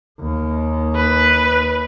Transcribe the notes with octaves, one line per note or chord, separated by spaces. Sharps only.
D#2
B4